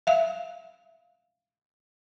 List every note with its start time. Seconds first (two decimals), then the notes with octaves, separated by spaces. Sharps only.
0.07 E5 F5